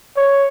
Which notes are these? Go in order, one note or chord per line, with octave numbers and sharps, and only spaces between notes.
C#5